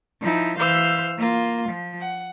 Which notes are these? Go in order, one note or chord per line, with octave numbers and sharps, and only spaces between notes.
F3 D#4 E4
E3 C5 F5 E6 F6 G6
A#3 F4
F3
F#5